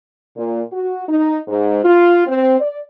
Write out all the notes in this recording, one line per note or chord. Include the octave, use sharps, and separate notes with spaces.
A#2
F#4
D#4
G#2
F4
C4
D5